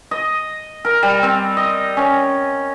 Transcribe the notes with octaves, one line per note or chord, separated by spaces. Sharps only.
D#5
A#4
G3
C4
D#5
C#4